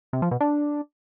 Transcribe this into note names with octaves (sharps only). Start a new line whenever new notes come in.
C3
F3
B2
D4